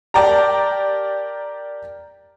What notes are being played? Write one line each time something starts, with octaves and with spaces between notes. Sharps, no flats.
G4 A#4 D5 G5 A5 A#5